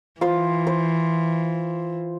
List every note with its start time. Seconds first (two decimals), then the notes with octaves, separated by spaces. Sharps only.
0.21 E3 F4 C5
0.67 C5